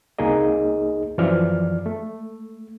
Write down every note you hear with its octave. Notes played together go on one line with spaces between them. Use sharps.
C2 A#3 D#4 G#4 D#5
F#2 E3 F3 D5 F6
A3